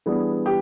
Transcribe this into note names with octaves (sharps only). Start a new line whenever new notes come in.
E3 G3 B3 D4 G#4
G4